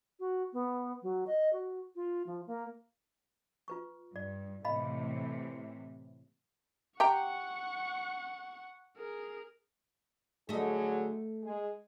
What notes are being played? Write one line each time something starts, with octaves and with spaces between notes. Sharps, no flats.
F#4
B3
F#3
D#5
F#4
F4
F3
A#3
F4 B4 C#6
G2 D5
A2 C3 E3 D#5 F5 B5
G4 F#5 G5 A#5 C#6
G#4 A#4
D3 F#3 A3 G#4 D#5
G#3 G#4